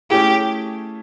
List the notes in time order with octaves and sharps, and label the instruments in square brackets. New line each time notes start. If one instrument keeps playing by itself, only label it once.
[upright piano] A3 C#4 E4 G#4 [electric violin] G4